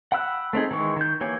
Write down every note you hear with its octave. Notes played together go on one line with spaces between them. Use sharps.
F#5 G5 B5 E6 F#6
A3 C4 D#4 G#4
D#3 E3 G#3 C#6
D#3 G6
E3 A#3 G4 C#5 G#5